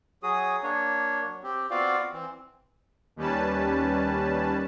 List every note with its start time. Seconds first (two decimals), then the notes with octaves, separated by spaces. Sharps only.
0.23 F#3 F#4 G#4 D#6
0.63 A#3 D4 C#5
1.24 F#3
1.43 C4 G4
1.70 B3 C4 F4 F#4 D5 F5
2.13 E3 C4
3.16 D#2 G3 C#4 B4 A5